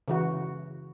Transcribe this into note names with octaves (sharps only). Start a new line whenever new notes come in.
C#3 E3 F#4